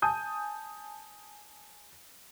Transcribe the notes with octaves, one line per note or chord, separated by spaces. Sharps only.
G#5 A5 D#6 G6